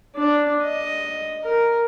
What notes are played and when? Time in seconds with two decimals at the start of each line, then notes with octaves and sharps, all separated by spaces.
0.16 D4
0.63 D#5
1.44 A#4